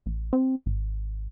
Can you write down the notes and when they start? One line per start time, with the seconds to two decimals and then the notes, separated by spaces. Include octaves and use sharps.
0.06 A1
0.33 C4
0.66 G#1